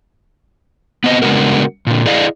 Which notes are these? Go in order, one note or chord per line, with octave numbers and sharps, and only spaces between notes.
B3 C4 D#5
C#3 G#3 B3 D4 F#4 A#4
A#2 D3
E4 G#4 D5 D#5 F5